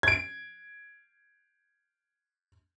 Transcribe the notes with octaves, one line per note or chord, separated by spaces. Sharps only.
G#6 D7